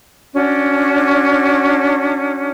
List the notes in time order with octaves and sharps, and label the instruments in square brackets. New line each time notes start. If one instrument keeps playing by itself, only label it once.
[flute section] C#4 D4 F#4